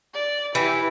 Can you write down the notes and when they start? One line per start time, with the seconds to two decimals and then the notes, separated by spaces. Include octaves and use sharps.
0.14 D5
0.55 E3 E4 G4